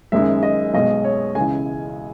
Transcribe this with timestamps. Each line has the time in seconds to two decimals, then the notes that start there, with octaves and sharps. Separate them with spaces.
0.12 F#1 F#2 D#3 G#3 E5
0.43 D#5
0.74 B1 B2 G#3 D#5
1.04 C#5
1.35 C#2 C#3 E3 G#3 G#5